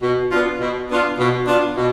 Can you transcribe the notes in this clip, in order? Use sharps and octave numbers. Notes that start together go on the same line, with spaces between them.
B2
B3 D4 F4
B2
B3 D4 F4
B2
B3 D4 F4
B2